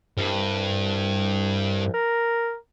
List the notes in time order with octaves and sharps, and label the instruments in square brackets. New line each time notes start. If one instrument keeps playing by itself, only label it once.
[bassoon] C2 [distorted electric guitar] G2
[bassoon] A#4